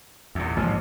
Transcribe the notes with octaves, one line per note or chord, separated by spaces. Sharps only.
E2 A#2
A1 G#2 C3 F3 A#3